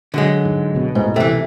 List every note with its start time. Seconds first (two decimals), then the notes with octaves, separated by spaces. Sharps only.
0.14 D3 F#3 G#3
0.45 G#2
0.75 C#2 B2
0.95 G#2
1.16 C3 E3 A3